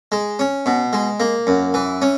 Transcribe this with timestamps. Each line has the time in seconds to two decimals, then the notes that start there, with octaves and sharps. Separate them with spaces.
0.12 G#3
0.39 C#4
0.66 B2
0.93 G#3
1.20 A#3
1.47 F#2
1.74 E3
2.02 C#4